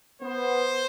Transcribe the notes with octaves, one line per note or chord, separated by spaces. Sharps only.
B3 C5